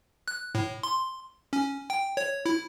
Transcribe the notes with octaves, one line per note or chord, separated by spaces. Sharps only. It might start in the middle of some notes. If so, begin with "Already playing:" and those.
F#6
A2
C6
C#4
G5
C#5
E4